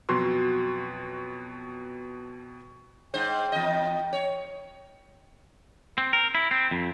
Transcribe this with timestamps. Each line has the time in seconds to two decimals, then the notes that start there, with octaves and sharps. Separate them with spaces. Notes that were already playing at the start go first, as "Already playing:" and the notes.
0.09 F2 B2 F#3 F#4 C6
3.14 G#2 C5 G5
3.52 E2 D#5
4.13 C#5
5.98 C4
6.13 A#4
6.35 E4
6.51 C4
6.71 F2